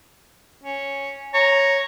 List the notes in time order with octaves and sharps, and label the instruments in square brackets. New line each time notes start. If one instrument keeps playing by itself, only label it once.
[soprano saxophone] C#4
[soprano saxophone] C#5 [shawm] A#5